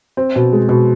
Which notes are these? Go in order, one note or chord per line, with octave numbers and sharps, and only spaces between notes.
C4
B2
G#3
B2